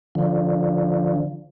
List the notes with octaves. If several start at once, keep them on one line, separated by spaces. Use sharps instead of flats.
D3 F3